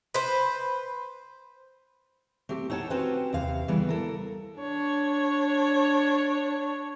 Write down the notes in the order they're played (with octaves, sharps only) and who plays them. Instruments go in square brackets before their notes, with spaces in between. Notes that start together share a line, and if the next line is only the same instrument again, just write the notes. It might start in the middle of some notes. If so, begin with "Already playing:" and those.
[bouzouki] B4 C5
[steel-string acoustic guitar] A3 C4 G4
D#4 A4 C#5 F#5 A5
C4 C#4 F#4 G4 B4 C5
D#2 C3 F5
C#3 E3 G3 B3
A4 A#4
[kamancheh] D4 C#5